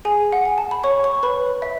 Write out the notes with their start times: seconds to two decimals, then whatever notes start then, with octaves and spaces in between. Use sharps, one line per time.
0.05 G#4 G#5
0.33 F#5
0.45 G#5
0.58 A5
0.71 B5
0.84 C#5 C#6
1.03 C#5 C#6
1.23 B4 B5
1.62 E5